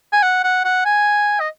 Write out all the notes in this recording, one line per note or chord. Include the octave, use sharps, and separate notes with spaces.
G#5
F#5
F#5
F#5
G#5
D#5